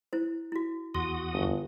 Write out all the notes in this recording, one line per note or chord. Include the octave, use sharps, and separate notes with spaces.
E4 C5
E4 F#4
E2 F#4 C6 D#6
G1